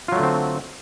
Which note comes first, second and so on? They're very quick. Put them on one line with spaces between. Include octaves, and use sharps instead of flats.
F4 F#3 A3 D3 C4